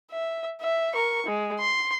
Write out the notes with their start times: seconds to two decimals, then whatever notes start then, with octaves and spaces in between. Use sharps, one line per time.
0.12 E5
0.61 E5
0.94 A#4 C#6
1.26 G#3
1.60 C6